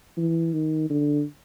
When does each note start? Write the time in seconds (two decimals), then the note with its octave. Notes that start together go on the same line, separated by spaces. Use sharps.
0.17 E3
0.53 D#3
0.90 D3